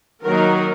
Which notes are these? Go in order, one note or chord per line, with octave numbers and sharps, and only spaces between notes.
D#3 F#3 A#3 D#4 A#4